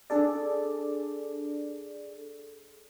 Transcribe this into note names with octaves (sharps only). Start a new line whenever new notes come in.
D4 G#4 A4 D5